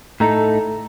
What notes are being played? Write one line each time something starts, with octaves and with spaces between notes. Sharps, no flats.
A2 A3 D#4 A4 A#5